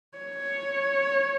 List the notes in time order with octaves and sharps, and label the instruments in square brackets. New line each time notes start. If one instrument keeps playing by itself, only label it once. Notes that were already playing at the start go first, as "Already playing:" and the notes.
[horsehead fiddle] C#5